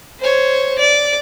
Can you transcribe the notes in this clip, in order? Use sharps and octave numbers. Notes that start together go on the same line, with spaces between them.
C5 C#5
D5